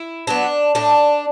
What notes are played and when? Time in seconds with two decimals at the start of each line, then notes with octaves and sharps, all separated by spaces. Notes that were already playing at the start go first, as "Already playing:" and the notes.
Already playing: E4
0.27 F#3 B3 D4
0.75 A2 D4